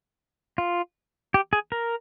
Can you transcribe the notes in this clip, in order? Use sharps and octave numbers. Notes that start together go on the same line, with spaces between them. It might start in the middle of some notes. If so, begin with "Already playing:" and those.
F4
G4
G#4
A#4